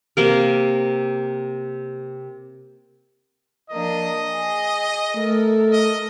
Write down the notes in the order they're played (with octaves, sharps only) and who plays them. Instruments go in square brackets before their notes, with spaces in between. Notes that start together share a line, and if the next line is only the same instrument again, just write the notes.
[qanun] C3 A#3 A#4
[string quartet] F3 A#3 D4 [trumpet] D#5
[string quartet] G#4
[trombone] A3 [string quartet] A4 A#4
[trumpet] D#5